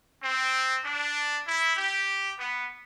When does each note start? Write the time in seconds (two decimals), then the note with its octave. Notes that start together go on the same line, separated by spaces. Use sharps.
0.22 C4
0.84 D4
1.45 E4
1.77 G4
2.38 B3